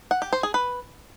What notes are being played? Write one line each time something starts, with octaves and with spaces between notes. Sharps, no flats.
F#5
G4
C5
G#4
B4